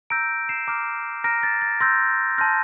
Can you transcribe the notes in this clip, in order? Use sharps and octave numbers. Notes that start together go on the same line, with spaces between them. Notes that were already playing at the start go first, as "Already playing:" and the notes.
A#5 E6 G6 A#6 D7
C7 E7
A#5 D6 F6
A#5 F6 A#6 D7
A6
A6
C6 E6 G6 A#6
A5 C6 F6 G6 A#6